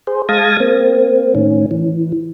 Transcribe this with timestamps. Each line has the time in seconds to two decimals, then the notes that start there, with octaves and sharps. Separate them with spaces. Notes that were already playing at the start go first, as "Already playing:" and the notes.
0.07 G#4 C5
0.29 G#3 F5 A5 D#6 G#6 A#6
0.60 A#3 C4
1.35 A2 D#3 C#4
1.71 E3